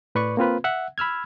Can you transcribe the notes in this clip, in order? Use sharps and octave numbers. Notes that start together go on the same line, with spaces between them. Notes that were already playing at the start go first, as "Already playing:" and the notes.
A2 B4 D5 C#6
A#3 C4 F4 B4
E5 F#5
B5 E6 F6 G#6